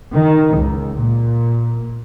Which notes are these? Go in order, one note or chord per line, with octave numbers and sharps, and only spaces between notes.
D#3
C#2
A#2